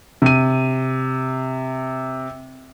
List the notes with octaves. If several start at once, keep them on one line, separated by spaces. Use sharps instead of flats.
C3 D#7